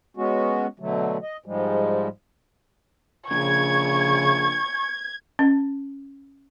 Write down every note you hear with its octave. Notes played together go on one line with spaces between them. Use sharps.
G#3 B3 C#4 F#4
B2 D3 F#3 A3
D#5
G#2 F3 G3 G#3
A#1 C#3 C#6 G#6
C#4